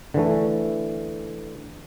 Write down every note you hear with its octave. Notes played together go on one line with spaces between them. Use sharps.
D3 E3 A3